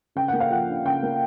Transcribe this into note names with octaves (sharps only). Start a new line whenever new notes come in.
C#3 G5
A#3 F#5
F5
F3 F#5
D4
C#3 G5
A#3